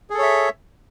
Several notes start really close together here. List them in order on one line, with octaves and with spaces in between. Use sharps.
G#4 A4 C#5 E5